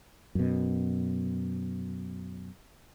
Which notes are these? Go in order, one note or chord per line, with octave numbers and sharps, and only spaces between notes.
F#2 B2